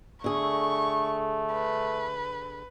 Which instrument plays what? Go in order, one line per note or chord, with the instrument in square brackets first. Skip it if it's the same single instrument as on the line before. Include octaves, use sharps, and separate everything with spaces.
[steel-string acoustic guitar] D3 G#4 [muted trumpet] A3 [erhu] C#6
[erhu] B4